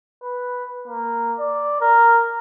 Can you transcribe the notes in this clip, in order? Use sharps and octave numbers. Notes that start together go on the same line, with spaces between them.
B4
A#3
D5
A#4